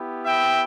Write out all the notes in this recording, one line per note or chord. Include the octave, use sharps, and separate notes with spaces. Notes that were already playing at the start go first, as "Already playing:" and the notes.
Already playing: B3 E4 G4
E5 G5